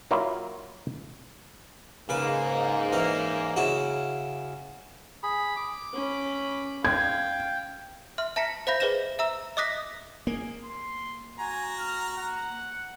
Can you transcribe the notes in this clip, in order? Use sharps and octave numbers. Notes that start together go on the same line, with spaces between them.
F#3 A#3 E4 F4
G#2 C#3 A#3 B4
E3 C#4
C#3 E4 F#4
G#4 B5
D6
C#4 B5
F5 G5 G#6
E5 C6 F6
E5 A5 A#5 A#6 B6 C#7
C5 E5 F5 B5 G6 A#6
G#4 B4 C5 D#5 A#6 E7
E5 A#5 E6
D#5 D6 D#6 F#6 A#6 B6
A#3 G#4
C6
F#4 G#5 A#5
F6
F#5